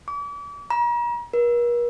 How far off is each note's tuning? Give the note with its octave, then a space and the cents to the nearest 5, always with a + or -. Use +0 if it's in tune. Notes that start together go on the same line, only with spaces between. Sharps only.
D6 -40
A#5 +40
A#4 +45